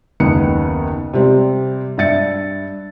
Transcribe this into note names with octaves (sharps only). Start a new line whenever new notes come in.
F#1 D#2 B3 C#7
C3 G3 C4
G2 E5 A6 C#7